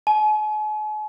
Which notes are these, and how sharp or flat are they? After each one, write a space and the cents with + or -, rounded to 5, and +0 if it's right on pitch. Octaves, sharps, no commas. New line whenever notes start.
G#5 +45